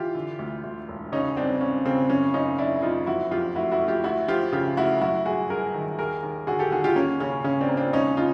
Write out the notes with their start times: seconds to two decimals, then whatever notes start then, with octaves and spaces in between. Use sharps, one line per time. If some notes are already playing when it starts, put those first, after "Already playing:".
Already playing: E3 F4 G4
0.15 D3
0.39 D2
0.64 D2
0.88 E1
1.12 C#3 C#4 D#4
1.36 G1 C4 D4
1.61 G1 C#4
1.85 C#3 C4
2.09 F#1 C#4
2.34 F#1 C#4 D#4
2.58 F#1 D4 E4
2.82 F#1 D#4 F4
3.06 F2 E4 F#4
3.31 F2 F4 G4
3.55 A3 E4 F#4
3.72 E4 F#4
3.80 A3
3.88 F4 G4
4.04 D2 E4 F#4
4.28 F3 F4 G4
4.52 C#3 F4 G4
4.77 A3 E4 F#4
5.01 F#2 E4 F#4
5.26 G1 F#4 G#4
5.50 G1 G#4 A#4
5.74 D#3
5.99 D#2 G#4 A#4
6.23 D#2
6.47 D3 F#4 G#4
6.59 G4 A4
6.72 D#2 F#4 G#4
6.84 F4 G4
6.96 A#3 C#4
7.20 C#3 C#4
7.44 C#3 C#4
7.61 C4 D4
7.69 A#3
7.77 C4 D4
7.93 E1 C#4 D#4
8.17 C#3 D#4 F4